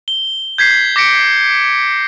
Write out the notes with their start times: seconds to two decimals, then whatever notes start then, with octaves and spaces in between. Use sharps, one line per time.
0.08 G7
0.58 G6 G#6 B6 C7
0.96 D6 A#6 B6 C#7 D7